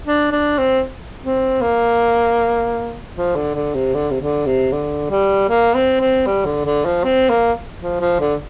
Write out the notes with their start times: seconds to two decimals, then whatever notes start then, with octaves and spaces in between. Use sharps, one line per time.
0.06 D4
0.32 D4
0.58 C4
1.23 C4
1.61 A#3
3.17 F3
3.36 D3
3.55 D3
3.75 C3
3.94 D3
4.11 C3
4.21 D3
4.46 C3
4.72 D3
5.10 G3
5.49 A#3
5.75 C4
6.00 C4
6.27 G3
6.45 D3
6.65 D3
6.85 F3
7.04 C4
7.29 A#3
7.82 F3
8.01 F3
8.20 D3